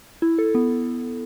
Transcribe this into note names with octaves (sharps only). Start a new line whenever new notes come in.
E4
A4
B3